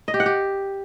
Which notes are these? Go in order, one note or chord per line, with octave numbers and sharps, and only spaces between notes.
D#5
G4
F#5
G4